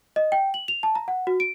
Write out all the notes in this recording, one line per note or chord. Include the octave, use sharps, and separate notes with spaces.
D#5
G5
F#7
F7
A5
A#5
F#5
F#4
D7